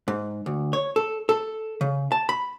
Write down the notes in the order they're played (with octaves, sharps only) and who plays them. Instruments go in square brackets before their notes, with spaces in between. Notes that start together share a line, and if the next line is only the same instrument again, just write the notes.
[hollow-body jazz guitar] G#2
D2
C#5
A4
A4
C#3
A5
B5